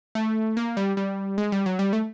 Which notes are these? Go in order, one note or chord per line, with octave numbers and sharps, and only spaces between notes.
A3
A#3
G3
G3
G#3
G3
F#3
G3
A3